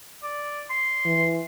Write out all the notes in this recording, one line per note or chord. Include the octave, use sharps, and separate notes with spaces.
D5
C6
E3